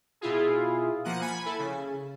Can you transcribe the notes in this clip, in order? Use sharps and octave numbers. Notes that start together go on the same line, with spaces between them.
B2 E4 F4 G#4
F3 A#3 F#5 D#7
G#5 B5 G#6
E4 A4
C#3